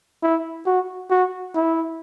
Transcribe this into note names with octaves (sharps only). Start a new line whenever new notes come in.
E4
F#4
F#4
E4